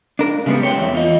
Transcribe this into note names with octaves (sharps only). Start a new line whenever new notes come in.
C#2 D4 A#4
C#3 G3 G#3 B3
B1 C4 C#5 G5
E2
F4 D#5